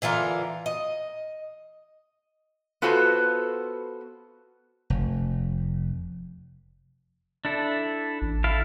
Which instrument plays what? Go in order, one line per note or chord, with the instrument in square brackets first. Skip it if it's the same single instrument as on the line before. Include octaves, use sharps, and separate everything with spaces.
[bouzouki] D3 E3 F4 A#4
D#5
[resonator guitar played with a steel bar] B3 F4 F#4 A4 B4 C5
[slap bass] F1
[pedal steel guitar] D4 E4 A4
[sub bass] A1
[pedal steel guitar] E4 A4 F5